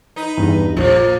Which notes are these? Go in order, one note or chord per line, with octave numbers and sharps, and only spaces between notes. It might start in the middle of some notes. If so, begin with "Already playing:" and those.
D#4 B4
E2 G2
A#1 F3 A#3